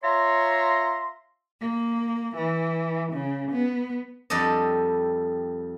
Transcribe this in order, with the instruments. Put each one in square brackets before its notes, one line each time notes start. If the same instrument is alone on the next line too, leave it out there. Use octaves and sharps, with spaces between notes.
[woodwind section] F4 C#5 E5 A#5 C6
[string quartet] A#3
E3
C#3
B3
[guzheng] F2 G3 A4 D5 D#5